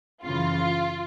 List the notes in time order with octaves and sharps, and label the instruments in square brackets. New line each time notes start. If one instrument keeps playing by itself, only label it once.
[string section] F#2 C#3 E3 F4